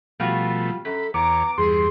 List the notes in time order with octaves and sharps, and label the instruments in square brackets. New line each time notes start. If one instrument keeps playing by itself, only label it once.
[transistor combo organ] B2 F3 A3 [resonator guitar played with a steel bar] G3 F4 F#4
[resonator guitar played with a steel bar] F#2 [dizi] A4 [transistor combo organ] B5
[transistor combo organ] E2 C#5 [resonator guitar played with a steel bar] B3 [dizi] A#5 [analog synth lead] D6
[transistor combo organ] E2 G2 [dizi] G#4 [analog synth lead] C6